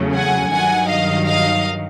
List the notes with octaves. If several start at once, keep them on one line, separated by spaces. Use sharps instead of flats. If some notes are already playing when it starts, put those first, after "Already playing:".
Already playing: E2 C#3 F#3 A3 C#4
F#5 G#5
G2 D#3 F#3 F#5 G#5
D#5 F5
D#5 F5